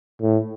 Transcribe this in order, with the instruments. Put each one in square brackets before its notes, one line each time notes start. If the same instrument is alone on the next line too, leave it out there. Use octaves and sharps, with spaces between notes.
[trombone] A2